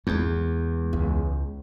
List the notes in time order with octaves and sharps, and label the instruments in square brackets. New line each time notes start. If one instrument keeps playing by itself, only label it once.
[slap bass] E2 [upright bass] G#3 A3
[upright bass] C#2